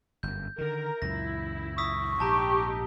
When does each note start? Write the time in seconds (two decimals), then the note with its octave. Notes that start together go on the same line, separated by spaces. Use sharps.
0.23 G1 F#2 G6
0.58 D3 D#3 A#4 A#5
1.02 C#2 F#2 A#2 E4 A#6
1.78 C#6 D#6 E6 B6
2.20 A#1 G#2 D#4 G4 A5 A#5